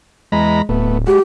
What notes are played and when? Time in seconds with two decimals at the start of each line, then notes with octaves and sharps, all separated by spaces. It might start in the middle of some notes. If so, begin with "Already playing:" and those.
0.32 E2 G#3 A#5 B5
0.69 D1 A3 B3
1.07 G#3 F#4 G4